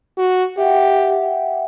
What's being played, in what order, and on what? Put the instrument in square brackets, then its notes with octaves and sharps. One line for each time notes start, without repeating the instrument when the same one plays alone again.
[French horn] F#4
[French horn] G4 [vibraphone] E5 F#5 G5